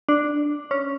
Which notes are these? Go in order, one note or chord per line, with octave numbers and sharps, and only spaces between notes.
D4
C#4